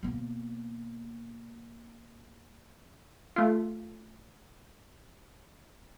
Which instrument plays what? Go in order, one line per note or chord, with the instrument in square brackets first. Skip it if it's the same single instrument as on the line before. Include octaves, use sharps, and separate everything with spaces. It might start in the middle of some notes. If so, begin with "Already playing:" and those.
[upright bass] B2 A#3
[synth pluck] A3 F4